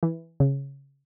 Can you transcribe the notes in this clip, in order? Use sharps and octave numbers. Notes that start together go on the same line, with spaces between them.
E3
C#3